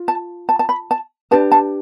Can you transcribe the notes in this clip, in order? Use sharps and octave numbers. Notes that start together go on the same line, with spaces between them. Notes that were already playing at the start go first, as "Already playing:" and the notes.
Already playing: F4
A5
A5
A5
B5
A5
D4 G4 B4 A5
A5